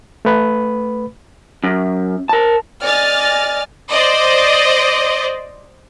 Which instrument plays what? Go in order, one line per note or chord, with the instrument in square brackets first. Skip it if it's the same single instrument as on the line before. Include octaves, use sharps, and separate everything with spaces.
[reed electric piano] A3 B4 B5
[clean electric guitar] F#2
A#4 A5
[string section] D5 D#5 G#5 F6 A6
[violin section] C5 D5 D#5